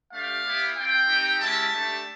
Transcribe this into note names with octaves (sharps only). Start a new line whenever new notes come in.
A3 D4 G4 F5
B3 E4 G4
C4 F4 G5
C4 D#4 G4
G#3 C#4 E4 G4 A5
A3 D4 G4